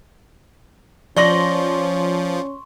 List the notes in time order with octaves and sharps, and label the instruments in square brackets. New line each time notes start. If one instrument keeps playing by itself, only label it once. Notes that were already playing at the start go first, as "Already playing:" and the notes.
[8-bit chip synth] F3 [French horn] C#4 [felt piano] D5 A#6 [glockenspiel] C6 C#6 G7